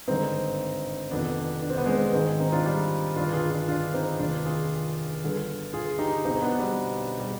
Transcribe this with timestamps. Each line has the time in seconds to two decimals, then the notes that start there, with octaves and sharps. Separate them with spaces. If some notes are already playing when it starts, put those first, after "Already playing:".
0.08 G#1 G2 D3 C4 D#4
1.11 F1 F2 D#3 B3 D4
1.62 D4
1.70 C4
1.78 B3
1.86 G#3 C4
2.13 G#1 G#2 D#3 G#3 C4
2.40 C4 D#4
2.52 D4 F4
2.66 G3
3.16 G1 G2 D#3 D4 F4
3.33 F4 G#4
3.50 D4 F4
3.68 D4 F4
3.94 C4 D#4
4.19 F1 D#2 D#3 D4 F4
4.46 F4 G#4
5.23 G1 G2 D3
5.73 F4 G#4
5.99 D#4 G4
6.25 B1 B2 C4 D#4
6.42 B3 D4
6.59 G3 B3
7.20 G3